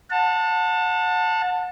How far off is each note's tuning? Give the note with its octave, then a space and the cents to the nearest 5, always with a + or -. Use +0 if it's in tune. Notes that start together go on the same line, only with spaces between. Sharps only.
F#5 -30 A5 +15